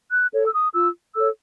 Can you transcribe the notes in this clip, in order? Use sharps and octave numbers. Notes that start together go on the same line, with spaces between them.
F#6
A4 C#5
E6
D#6
F4 E6
A4 C#5 E6